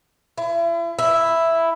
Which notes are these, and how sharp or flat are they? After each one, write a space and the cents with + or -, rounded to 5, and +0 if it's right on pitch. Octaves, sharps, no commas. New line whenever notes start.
E4 +40
E4 +0